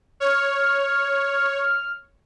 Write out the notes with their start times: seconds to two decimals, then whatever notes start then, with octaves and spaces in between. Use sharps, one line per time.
0.20 C#5 F6